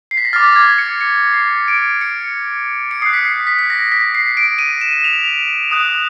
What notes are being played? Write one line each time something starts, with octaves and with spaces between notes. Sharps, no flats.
C7
B6
A#6
D6 F6 A6
G#6
C#7
C#7
C7
D7
C#7
C#7
D#6 F#6 C7
B6
C7
B6
B6
A#6
B6
C7
D7
D#7
E7
F7
D#6 F#6